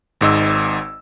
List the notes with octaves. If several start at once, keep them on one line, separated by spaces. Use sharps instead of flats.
G#1 G#2 D#5 E6